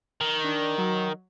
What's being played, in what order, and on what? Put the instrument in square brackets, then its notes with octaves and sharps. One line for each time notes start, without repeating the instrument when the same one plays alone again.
[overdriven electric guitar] D#3
[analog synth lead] D4
F#3